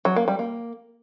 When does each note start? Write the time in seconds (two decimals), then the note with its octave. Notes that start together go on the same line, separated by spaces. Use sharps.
0.05 F#3
0.16 A#3
0.28 G3
0.39 A#3